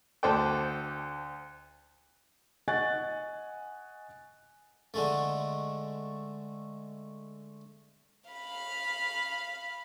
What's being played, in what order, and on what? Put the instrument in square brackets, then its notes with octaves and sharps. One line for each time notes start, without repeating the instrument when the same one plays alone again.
[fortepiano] D2 A4 C5 D5 G5
[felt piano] D#5 F#5 G#5 C#6 F#6 A6
[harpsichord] D3 G#3 A3
[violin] F5 B5